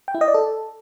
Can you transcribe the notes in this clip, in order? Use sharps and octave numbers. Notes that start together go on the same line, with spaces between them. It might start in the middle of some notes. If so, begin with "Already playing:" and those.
G5
E4
D#5
D5
A4